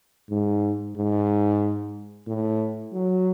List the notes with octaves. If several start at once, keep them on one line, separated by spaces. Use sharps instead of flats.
G#2
G#2
A2
F#3